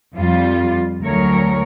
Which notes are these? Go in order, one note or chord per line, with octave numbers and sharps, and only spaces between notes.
F2 G3 F4
D2 F#3 A#4 C#5